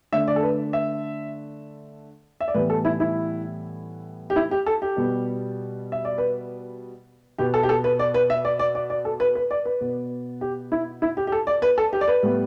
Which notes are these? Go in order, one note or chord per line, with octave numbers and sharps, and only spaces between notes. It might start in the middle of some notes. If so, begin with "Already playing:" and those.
D3 A3 E5
D5
A4
B4
E5
E5
D5
A2 E3 G3 B3 B4
A4
E4
E4
G4
E4
G4
A4
G4
B2 G3 B3
E5
D5
B4
B2 B3 G4
A4
G4
A4
B4
D5
B4
E5
D5
D5
D5
D5
A4
B4
B4
D5
B4
B2 B3
G4
E4
E4
G4
G4
A4
D5
B4
A4
G4
D5
B4
A2 G3 B3